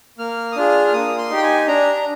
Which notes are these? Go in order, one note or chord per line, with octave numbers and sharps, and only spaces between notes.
A#3 F6
D#6
D4 F4 G#4 F6
F6
A#3 D#6
C6
D#4 G4
G5
G#5
D4 A#5
A#5